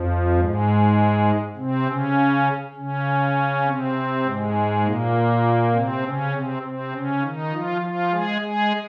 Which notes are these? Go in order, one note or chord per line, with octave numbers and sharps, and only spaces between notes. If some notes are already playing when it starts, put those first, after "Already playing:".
Already playing: F2 F3
G#2 G#3
C3 C4
C#3 C#4
C#3 C#4
C3 C4
G#2 G#3
A#2 A#3
C3 C4
C#3 C#4
C3 C4
C3 C4
C#3 C#4
D#3 D#4
F3 F4
F3 F4
G#3 G#4
G#3 G#4